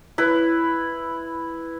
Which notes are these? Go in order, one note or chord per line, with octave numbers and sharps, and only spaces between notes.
E4 B4